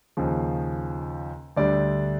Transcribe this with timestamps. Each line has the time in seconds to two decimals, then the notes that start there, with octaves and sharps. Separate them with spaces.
0.17 D#2 C#3 F3
1.57 D2 D3 G3 D5